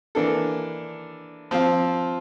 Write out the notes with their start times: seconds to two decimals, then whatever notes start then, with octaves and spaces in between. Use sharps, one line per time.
0.15 E3 A#3 D4 A4
1.51 F3 C4 F4